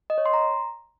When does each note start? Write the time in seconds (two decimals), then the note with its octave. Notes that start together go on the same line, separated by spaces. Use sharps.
0.10 D#5
0.18 C#5
0.26 C6
0.33 A#5